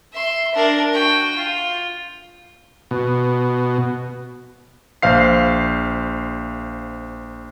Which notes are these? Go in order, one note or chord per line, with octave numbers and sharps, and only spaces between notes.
E5 C6
D4 A#4
F#4 G5
F4
B2
A#1 C5 F5 C7